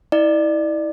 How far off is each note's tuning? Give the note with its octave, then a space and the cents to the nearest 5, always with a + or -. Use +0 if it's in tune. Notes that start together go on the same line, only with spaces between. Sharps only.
E4 -30 D5 +25